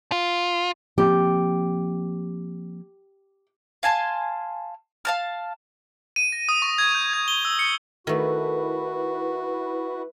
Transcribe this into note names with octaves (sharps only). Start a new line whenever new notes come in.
F4
F3 A#3 C4 G4
F5 G#5 A5 C6
F5 A5 F6
D#7
A#6
D#6
C#6
G#6
G6
G#6
G7
E6
C#7
D#3 A3 E4 F#4 B4